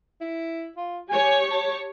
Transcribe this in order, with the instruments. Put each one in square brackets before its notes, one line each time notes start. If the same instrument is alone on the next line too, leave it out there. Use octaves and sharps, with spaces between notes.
[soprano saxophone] E4
F4
[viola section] G4 C#5 [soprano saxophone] G#5
[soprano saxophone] A5